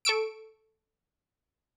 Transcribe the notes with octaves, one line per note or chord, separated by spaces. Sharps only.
A4 C#6 E6 D7